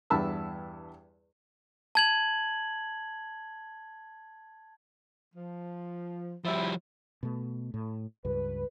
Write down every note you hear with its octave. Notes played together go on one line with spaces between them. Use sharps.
E2 G2 A5 B5 E6
A5 G#6 F#7
F3
F3 G3 E4
B2 A3
A2
C#2 G2 B4